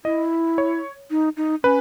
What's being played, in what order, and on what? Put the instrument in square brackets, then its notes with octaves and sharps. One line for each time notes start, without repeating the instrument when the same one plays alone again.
[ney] E4 [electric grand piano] D#5
[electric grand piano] C#5
[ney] D#4
D#4
[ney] C#4 [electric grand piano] B4